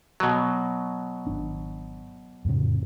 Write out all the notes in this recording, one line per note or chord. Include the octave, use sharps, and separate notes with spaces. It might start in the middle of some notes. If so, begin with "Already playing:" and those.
B2 F#3
G#1 D4
F2 A2 C#3